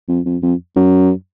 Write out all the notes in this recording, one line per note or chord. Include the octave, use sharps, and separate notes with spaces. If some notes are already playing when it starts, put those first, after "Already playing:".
F2
F2
F2
F#2